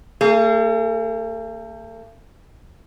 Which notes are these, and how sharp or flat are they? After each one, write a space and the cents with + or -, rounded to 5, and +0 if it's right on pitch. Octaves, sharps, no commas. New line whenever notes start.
A3 +45 G#4 +0